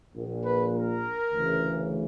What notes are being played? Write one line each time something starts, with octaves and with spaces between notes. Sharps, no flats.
A#1 A#2
B4
A#4
D2 C#3 E3